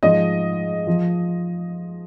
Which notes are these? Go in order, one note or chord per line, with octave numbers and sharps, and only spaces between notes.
G#2 F3 D#5
F3